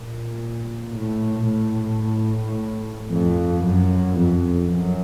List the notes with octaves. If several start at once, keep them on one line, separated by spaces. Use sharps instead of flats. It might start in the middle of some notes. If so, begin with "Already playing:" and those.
Already playing: A#2
A2
A2
F2
F#2
F2
F#2